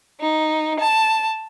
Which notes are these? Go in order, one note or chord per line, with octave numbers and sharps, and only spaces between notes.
D#4
A5